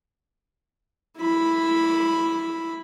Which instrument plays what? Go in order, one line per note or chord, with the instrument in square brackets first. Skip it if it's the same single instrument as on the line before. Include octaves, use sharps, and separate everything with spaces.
[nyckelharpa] E4 B5